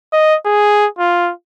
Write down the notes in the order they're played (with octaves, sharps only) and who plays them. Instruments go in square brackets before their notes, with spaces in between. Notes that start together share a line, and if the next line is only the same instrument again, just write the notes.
[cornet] D#5
G#4
F4